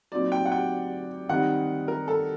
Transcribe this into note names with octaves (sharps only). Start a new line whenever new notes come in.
A#2 F#3 C4 D#4 D5
G5
F#5
G5
D#3 G3 C4 D#4 F#5
A#4
A4